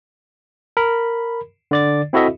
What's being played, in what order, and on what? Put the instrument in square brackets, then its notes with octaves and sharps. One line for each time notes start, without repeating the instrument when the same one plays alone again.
[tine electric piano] A#4 B5
D3 D5 A6
C4 E4 F#4 A4 D#5 E5